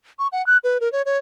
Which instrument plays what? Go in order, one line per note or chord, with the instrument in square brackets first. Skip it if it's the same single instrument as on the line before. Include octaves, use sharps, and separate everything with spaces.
[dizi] C#6
F#5
F#6
B4
A#4
C#5
C#5